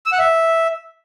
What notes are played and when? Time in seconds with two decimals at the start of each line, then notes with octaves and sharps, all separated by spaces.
0.06 E6
0.12 F#5
0.19 E5